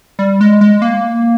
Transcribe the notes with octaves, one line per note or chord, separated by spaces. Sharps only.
G3
G#3
G#3
A#3